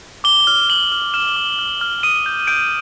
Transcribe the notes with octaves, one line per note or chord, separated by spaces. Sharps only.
D6 G7
F6
F6 F#7
F6
F6 E7
D6
F6
F6
D#6 D#7
G6
G6 D7